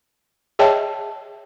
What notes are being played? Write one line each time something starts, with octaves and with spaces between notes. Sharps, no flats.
G#4 C#5 D#5 E5 G5 A5